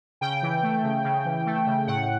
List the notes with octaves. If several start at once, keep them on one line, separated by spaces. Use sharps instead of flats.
C#3 G5
E3
A3
C#3
C#3
E3
A3
C#3
A2 F#5